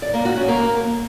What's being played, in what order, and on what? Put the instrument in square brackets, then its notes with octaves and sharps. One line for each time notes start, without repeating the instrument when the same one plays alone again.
[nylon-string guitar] D5
A#3
F#4
C#4
A#3